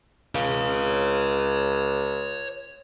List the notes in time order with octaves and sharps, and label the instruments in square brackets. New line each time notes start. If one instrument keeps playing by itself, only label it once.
[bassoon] C#2 [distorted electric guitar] C#5 F5